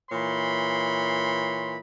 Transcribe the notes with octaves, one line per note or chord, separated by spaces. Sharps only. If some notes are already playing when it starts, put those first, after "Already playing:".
A#2 E3 C#5 B5 C6